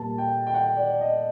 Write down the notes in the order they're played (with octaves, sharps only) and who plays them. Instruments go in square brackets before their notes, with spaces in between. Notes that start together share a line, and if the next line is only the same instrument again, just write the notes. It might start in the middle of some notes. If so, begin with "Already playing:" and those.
Already playing: [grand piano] A#2 G3 A#3 A5
G5
G5
F#5
D5
D#5